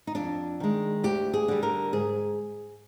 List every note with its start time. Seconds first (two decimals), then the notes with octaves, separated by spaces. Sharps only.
0.07 D#4
0.15 F2 D4
0.60 D#3 G#3
1.03 D2 G4
1.34 G#4
1.48 D3 G3
1.63 A#4
1.92 G#2 G#4